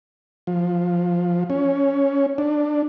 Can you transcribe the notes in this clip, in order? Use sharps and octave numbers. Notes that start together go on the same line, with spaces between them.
F3
C#4
D4